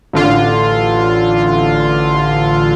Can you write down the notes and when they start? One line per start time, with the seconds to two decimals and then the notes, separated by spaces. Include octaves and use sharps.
0.13 A1 D3 F4